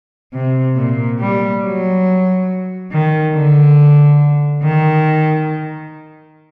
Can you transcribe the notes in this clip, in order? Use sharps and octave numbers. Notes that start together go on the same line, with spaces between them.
C3
A#2
G3
F#3
D#3
D3
D#3